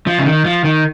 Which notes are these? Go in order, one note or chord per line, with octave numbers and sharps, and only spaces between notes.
F3
C#3
D#3
F3
D#3